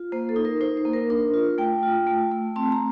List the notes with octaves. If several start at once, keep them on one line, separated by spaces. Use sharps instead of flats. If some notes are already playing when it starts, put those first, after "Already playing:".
Already playing: F4
A#3 C5
A4
D#4
A#4
D#4 C5
C5
A#3
A#4
D4 A#4
F4
A3 G5
F4
A3
A3
C4 A5
A#5